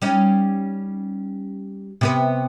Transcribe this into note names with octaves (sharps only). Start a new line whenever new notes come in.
G3 C#4 D#4
C3 B3 B4